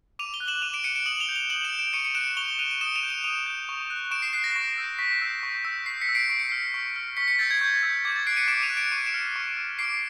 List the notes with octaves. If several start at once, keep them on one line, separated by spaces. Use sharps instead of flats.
D6 D#7 F7
F7 G7
F#6
E7 F#7
D6 D#7 F7
D7 E7
F#6 C#7 D#7
D7 E7
D#6 E7 F#7
F7 G7
G6
F7 G7
D#6 E7 F#7
D7 E7
G6
D7 E7
C#6 C#7 D#7
C#7 D#7
F#6 D7 E7
C#6 F7 G7
F#6 D#7 F7
D#7
D#6 D7 E7
D#7 F7
G6
D#7 F7
D#6 D#7 F7
G6
C#6
F#6
C#6 D7 E7
C7
F#6 C7
A#6
C#6
E6 G6
C#6 B6
E6 G6
C#6
E6 G6
C#6 C7
B6 C#7
E6 G6
C7 D7
C#6 D7
C#7
F6 C7 D7
C#6
F6
C#6 B6 C#7
B6 C#7
E6 G6 A6
G#6
C#6 G6
E6 G6
D6 G#6
A6
F#6 C7 D7
C#7 D#7
D6 D7 E7
D#7 F7
F#6
D7 E7
C#6 C#7 D#7
D7 E7
F6
C#6
F6
D6 C7 D7